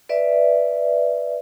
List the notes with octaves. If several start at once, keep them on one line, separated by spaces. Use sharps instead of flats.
B4 D5 E5